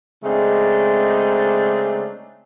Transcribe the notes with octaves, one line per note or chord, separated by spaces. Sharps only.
C#3 G#3 A3 C4 D4 D#4